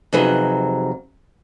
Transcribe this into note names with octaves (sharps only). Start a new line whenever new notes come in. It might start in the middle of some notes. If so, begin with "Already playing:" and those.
F2 C3 F#3 D#4 G#4 B4